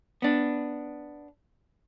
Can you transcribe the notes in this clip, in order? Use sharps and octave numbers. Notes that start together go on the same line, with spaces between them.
B3 D4